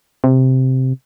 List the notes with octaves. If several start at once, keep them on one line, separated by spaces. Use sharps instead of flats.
C3